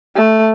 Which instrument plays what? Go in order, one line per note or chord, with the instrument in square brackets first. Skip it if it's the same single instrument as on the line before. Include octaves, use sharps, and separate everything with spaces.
[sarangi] A3